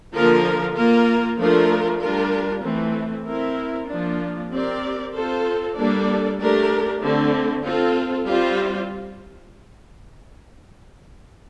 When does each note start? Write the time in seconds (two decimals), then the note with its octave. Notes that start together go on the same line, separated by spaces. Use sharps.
0.14 D3 F3 A#3 F4 A#4
0.76 A#3 F4 A#4
1.38 F3 A3 D4 F4 A#4
2.01 G3 D4 F4 A#4
2.64 E3 A3 C4
3.26 C4 E4 A#4
3.89 F3 A#3 D4
4.52 C4 G4 A#4 D5
5.14 C4 F4 A4 C5
5.76 G3 A#3 D4 A4 D5
6.40 A3 D4 G4 A#4
7.02 D3 A3 C4
7.64 C4 F4 A4
8.28 G3 C4 F4 C5